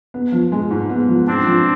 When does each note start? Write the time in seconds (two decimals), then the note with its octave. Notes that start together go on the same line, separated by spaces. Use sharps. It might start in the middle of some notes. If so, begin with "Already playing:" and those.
0.14 B3
0.32 F3
0.52 G#3
0.71 G#2
0.90 B3
1.08 F3
1.27 G#2 C4 D4
1.46 F3